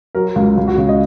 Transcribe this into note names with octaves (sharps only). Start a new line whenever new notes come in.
F#3 A#4
C#2
C#2
F#4
C#3
D#5